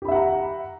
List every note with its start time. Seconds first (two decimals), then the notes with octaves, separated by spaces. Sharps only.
0.02 G4
0.05 B5
0.08 E5
0.12 F#5
0.15 A#5